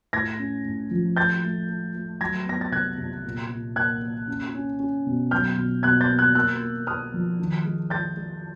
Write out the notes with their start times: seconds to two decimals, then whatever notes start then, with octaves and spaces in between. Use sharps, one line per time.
0.13 A2 G#6 A#6
0.39 C#4
0.65 A2
0.91 F3
1.16 A3 G6 A6
1.44 A3
1.69 A3
1.95 A3
2.21 F#3 G#6 A#6
2.46 B3 A#6
2.61 A6
2.72 C3 F#6 G#6
2.98 C3
3.25 A#2
3.51 A#2
3.76 A#3 F#6 G#6
4.02 A#3
4.27 C#4
4.54 C#4
4.79 C#4
5.06 B2
5.31 F#3 F6 G6
5.57 B2
5.83 B2 F#6 G#6
6.01 G6 A6
6.10 A#3
6.19 F#6 G#6
6.35 A#3 E6 F#6
6.61 A#3
6.87 A#3 D#6 F6
7.14 F3
7.39 D#3
7.65 G#3
7.90 G#3 G6 A6
8.16 G#3